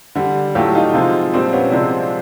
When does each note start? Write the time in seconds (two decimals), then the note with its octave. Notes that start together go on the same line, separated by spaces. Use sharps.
0.15 D3 G3
0.55 A2 F#3 A3 F4 G4
0.75 D#4 F4
0.94 C3 F3 G#3
1.33 A#2 G3 C4 D4
1.53 B3 C#4
1.72 C3 F3 G#3 C4 D4